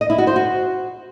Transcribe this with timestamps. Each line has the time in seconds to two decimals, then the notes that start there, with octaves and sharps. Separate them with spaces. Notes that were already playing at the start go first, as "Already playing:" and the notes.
0.01 D#5
0.10 E4
0.18 F#4
0.27 C5
0.36 F#4